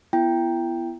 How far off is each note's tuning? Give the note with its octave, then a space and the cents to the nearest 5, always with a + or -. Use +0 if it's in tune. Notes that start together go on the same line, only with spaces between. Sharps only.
B3 +0 E4 +30 G5 +0